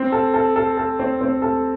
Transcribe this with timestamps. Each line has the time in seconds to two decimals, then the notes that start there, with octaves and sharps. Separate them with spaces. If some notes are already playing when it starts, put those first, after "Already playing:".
Already playing: C4
0.12 A4
0.34 A4
0.56 A4
0.77 A4
0.99 C4
1.21 C4
1.42 A4